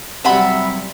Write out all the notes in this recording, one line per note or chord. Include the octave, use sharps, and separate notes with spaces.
C3 F#3 G3 E5 F#5 B5